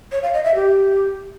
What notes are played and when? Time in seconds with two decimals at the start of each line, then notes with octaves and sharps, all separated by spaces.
0.12 C#5
0.23 F5
0.33 D#5
0.44 E5
0.55 G4